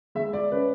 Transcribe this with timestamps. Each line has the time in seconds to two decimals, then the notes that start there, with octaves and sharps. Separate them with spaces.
0.15 G#3 E5
0.33 D5
0.52 C#4 B4